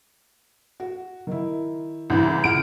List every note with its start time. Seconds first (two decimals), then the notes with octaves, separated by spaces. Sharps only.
0.80 F#4
1.27 D#3 E4
2.10 C2 C#3 E3
2.44 C#2 F#5 F6 D7